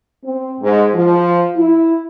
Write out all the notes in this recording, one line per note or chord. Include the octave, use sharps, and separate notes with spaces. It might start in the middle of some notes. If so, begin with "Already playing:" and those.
C4
G#2
F3
E4